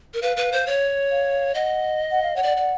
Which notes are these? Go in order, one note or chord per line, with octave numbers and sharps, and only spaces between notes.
A#4
B4 F5
B4
C5
C#5
F5
D#5 F#5
F#5
F5
C#5 F#5
D5
D5